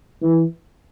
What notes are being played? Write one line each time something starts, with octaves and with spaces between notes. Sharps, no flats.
E3